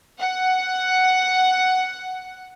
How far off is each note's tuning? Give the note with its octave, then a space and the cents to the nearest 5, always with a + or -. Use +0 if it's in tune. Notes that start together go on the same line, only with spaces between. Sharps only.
F#5 +5